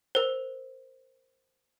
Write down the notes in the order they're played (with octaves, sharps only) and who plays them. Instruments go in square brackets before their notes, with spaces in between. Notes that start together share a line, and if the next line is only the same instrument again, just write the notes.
[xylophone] A#4 C5